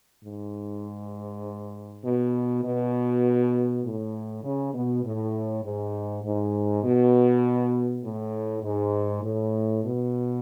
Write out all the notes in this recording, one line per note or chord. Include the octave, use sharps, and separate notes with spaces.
G#2
B2
B2
A2
C#3
B2
A2
G#2
G#2
B2
A2
G#2
A2
B2